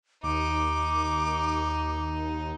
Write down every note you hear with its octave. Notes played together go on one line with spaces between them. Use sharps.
D#2 D#4 D6